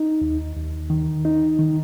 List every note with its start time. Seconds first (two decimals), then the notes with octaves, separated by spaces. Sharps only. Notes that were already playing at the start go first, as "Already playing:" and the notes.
Already playing: D#4
0.21 D#2
0.56 D#2
0.90 D#3
1.25 D#4
1.59 D#3